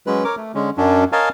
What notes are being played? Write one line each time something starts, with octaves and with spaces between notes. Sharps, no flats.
F#3 G#3 C#4 B4
A#4 C#5 D6
A3
D3 G#3 C#4
F#2 F#3 C#4 D4
A#4 C#5 D#5 F5 G#5 A5